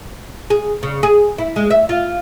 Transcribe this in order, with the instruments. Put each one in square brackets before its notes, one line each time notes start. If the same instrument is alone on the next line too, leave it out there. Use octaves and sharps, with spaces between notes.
[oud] G#4
C#3
G#4
E4
G#3
E5
F4